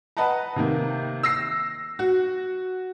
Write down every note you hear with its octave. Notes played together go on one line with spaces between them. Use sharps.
B4 D#5 F#5 A5 A#5
C3 D#3 A#3
E6 A#6 C7
F#4